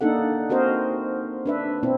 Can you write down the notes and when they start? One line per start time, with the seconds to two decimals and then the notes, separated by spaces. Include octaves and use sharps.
0.01 A#3 D4 D#4 A4 F#5
0.50 C4 F#4 A#4 C5 D#5
1.46 D4 B4 E5
1.83 B2 C4 E4